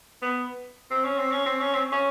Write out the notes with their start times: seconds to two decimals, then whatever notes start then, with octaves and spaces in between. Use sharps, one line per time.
0.22 B3
0.91 C4
1.05 C#4
1.19 C4
1.32 C#4
1.46 C4
1.60 C#4
1.75 C4
1.92 C#4